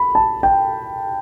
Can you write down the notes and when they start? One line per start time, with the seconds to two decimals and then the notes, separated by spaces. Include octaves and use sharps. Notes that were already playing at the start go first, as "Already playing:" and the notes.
Already playing: B5
0.15 A5
0.43 G5